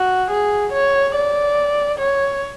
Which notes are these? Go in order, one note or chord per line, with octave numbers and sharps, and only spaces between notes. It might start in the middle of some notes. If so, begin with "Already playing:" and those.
Already playing: F#4
G#4
C#5
D5
C#5